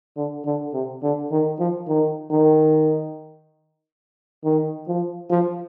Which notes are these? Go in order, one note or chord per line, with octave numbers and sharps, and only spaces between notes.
D3
D3
C3
D3
D#3
F3
D#3
D#3
D#3
F3
F3